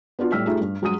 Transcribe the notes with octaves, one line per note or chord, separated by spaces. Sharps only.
B3 D4 F4 F#4
A2 G3 E6 F6 B6
A3 D#4 F4 G4 G#4
G2
G2 F#3 G#3 G#4 D#6 D#7